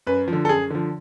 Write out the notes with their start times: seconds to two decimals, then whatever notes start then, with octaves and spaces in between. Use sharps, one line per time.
0.07 F#2 B4
0.28 D3 F3
0.45 A4
0.49 F#2 G#4
0.70 D3 F3